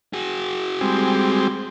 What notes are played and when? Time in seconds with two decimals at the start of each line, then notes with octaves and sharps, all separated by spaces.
0.13 F#4 G#4
0.81 G3 G#3 C4